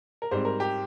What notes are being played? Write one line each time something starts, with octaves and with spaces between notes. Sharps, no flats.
A#4
G#2 G3 C4 C5
A#4
G4